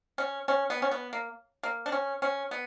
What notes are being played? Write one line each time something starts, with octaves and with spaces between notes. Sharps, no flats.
C#4
C#4
B3
C#4
B3
A#3
A#3
D4
C#4
C#4
B3